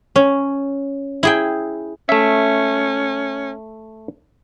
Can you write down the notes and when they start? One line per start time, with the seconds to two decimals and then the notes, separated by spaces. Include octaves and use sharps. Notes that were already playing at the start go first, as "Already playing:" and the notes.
0.16 C#4
1.23 E4 G#4 G5
2.09 A3 C#4 E5